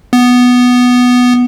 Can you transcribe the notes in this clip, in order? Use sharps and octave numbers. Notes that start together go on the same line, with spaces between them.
B3